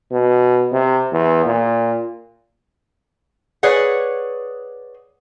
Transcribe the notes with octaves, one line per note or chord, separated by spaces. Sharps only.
B2
C3
E2
A#2
G#4 B4 C#5 D5 F#5